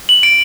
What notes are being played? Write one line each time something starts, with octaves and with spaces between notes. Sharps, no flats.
F#7
D7